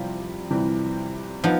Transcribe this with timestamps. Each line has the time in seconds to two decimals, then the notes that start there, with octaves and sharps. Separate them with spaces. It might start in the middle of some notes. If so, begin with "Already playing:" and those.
Already playing: C3 E3 F3 G3
0.50 C3 E3 G3
1.44 F3 B3 D#4